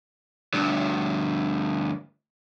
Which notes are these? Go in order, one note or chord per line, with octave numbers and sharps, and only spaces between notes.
D2 G2